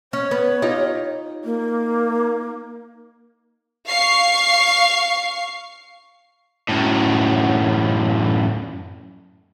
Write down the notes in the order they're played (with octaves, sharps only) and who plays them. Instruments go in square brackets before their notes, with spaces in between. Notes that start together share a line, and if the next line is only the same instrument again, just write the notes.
[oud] C#4 [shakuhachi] C#5
[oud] B3
D#4 F4 G4
[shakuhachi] A#3
[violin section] F5 C#6 C7
[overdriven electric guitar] F#2 A2